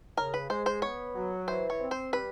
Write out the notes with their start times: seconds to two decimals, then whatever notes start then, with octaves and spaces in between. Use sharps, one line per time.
0.17 C#3 A#4
0.34 B4
0.50 G#3 C5
0.66 C5
0.82 B3 C#5
1.15 F#3
1.48 E3 C5
1.70 C#5
1.80 C4
1.91 C5
2.13 G3 B4